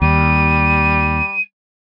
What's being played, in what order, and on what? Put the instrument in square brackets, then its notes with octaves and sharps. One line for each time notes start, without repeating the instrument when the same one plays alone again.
[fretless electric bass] D#2 [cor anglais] G3 [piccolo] D#7